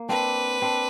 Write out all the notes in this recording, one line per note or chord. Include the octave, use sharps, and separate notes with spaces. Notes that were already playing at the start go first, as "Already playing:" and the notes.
Already playing: A#3
C4 D4 B4
C4 D4